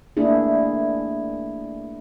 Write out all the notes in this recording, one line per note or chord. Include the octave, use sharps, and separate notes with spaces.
A3 A#3 D4 E4 G#4